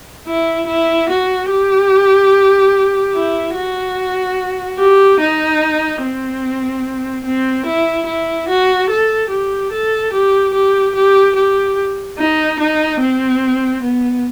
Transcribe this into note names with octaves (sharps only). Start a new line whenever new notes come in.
E4
E4
F#4
G4
E4
F#4
G4
D#4
C4
C4
E4
E4
F#4
A4
G4
A4
G4
G4
G4
G4
D#4
D#4
C4
B3